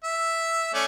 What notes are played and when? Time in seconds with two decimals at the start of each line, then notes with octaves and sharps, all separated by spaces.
0.04 E5
0.74 A3 C#4 D5